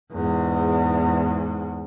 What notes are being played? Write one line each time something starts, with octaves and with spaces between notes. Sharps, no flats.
E2 G#2